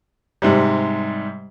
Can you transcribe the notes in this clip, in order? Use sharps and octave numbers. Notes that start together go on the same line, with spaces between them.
G#2 C3 G3